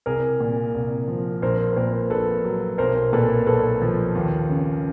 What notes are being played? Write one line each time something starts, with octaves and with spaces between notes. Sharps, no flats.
C2 G#4 A#4
A#2
C2
F3
A#1 A#4 C5
B4
A#2 A#4 C5
A#1 A4 B4
F#3
B1 A#4 C5
A#2 A4 B4
B1 A4 B4
F3
D#2
C#3